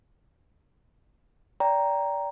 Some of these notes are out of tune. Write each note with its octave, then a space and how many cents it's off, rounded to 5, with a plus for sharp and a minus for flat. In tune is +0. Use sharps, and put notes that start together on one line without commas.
D5 -25 G5 +0 A#5 +0